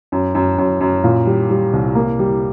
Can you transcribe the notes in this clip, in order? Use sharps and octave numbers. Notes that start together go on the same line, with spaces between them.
F#2
F#2
F#2
F#2
A#2
G3
G3
C2
A#3
G3